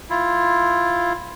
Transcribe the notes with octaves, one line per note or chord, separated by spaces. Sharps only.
E4 F4